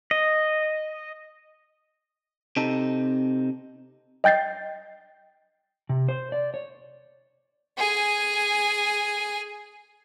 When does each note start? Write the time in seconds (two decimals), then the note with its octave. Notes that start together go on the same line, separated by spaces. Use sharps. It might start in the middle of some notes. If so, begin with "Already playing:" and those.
0.11 D#5
2.56 C3 C4 D#4 A4
4.24 D#5 G5 G6 A6 C7
5.89 C3
6.09 C5
6.32 D5
6.54 C#5
7.78 G#4 G#5